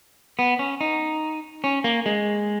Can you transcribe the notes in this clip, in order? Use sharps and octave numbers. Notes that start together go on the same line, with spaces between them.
B3
C#4
D#4
C#4
A#3
G#3